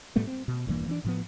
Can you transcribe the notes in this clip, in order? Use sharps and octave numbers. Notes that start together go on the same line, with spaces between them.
A2 G3 A3 B3
C4
B2
E1 G2 E3 A#3
E3 C4 D4
A2 F3 B3